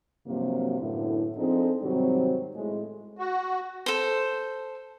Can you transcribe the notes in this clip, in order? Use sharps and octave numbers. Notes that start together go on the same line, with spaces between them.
G2 C3 F3 F#3 A#3
F#2 A2 D3 B3 E4
F3 C4 D4 D#4 G#4 A4
G#2 C3 D#3 F#3 G3 C4
A2 G#3
F#4
A4 C5